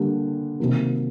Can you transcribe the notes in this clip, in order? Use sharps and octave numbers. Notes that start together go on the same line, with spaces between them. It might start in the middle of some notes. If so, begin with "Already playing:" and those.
Already playing: D3 G3 A#3
C3 D#3 F#3 A#3